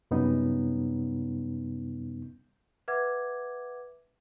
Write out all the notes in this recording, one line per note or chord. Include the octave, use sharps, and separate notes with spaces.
F#2 C3 G3 B3 C#4 D#4
B4 E5 F#5 D6 G#6